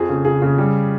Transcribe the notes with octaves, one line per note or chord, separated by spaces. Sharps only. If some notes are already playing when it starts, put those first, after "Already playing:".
Already playing: F2 G#4
C#3
C#3 G#4
C#3
G3